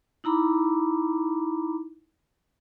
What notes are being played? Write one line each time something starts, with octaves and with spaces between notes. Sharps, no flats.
D#4 E4 A#5 B5 D6